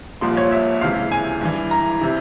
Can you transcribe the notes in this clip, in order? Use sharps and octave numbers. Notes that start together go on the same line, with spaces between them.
C2 A#2 F3 C6
C#5
E5
C#2 C3 E3 F5
G#5
G2 E3
A#5
C3 E3